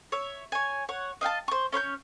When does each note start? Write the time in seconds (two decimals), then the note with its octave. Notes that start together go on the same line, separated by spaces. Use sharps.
0.12 C#5 E5
0.52 C#5 G#5
0.89 C#5 F#5
1.21 D#5 F5 G5 A5
1.48 C5 C#6
1.72 C#4 C#5 B5 G6